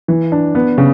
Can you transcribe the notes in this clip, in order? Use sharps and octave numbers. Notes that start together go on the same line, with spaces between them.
E3
D4
B3
C#3